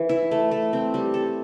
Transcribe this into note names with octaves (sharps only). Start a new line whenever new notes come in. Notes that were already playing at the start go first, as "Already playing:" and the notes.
Already playing: E3
E4
A3
A3
C4
G3
A4